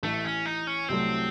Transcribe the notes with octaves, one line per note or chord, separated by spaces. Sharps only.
A1 A2 E3 A3
C#4
D#4
C#4
C2 C3 F#3 A3 C4